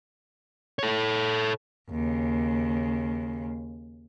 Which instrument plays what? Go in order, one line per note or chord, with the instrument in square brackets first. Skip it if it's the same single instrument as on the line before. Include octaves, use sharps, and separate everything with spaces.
[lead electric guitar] A4 C#5
[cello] D#2 C#3